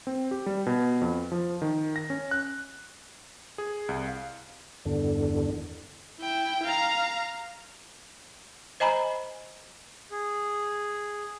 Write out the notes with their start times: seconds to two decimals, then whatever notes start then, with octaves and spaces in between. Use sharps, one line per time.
0.07 C4
0.31 G4
0.46 G3
0.66 B2
1.01 F2
1.32 F3
1.62 D#3
1.96 A#6
2.10 C#4
2.31 F#6
3.58 G#4
3.89 C2
4.08 F5
4.85 E2 G2 D3
6.20 E4 G5
6.64 F5 A#5
8.80 C5 D#5 G#5 A#5 B5
10.11 G#4